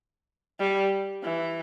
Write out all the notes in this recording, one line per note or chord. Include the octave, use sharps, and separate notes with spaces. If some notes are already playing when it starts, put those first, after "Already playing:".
G3
E3